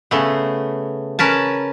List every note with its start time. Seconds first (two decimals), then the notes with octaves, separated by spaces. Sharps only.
0.11 C#3 A3 B3
1.19 C#4 A#4 B4 A5